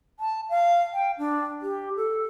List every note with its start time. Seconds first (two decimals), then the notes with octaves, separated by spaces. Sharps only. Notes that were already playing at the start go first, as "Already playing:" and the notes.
0.20 A5
0.50 F5
0.93 G5
1.18 D4
1.62 G4
1.96 A4